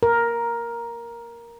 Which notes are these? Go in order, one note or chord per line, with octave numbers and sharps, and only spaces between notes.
A#4